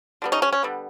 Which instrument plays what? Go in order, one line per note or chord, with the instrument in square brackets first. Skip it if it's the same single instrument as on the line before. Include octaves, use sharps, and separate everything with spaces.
[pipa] D3 G3 B3
C#4 D#4
C#4
C#4
D3 G3 B3